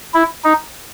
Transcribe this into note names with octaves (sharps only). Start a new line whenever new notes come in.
E4
D#4